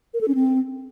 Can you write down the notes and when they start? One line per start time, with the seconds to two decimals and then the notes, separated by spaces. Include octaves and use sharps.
0.14 A#4
0.21 A4
0.28 C#4
0.35 C4